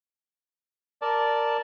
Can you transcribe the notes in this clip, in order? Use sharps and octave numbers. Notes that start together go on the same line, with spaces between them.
A#4 D5 A5